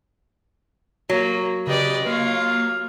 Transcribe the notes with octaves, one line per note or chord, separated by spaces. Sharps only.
F#3 A#3
C#3 G4 B4 D5 D#5
A#3 F4 C#5 F5